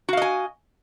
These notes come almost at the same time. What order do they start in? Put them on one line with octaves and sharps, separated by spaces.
F#4 F5 D#5 G#5